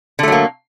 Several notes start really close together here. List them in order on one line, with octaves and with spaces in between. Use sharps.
D3 A3 F#3 A#3